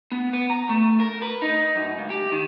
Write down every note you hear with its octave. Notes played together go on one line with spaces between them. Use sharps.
B3
B3
A#5
A3
A#4
B4
D#4
F#2
C#2
G4
D#3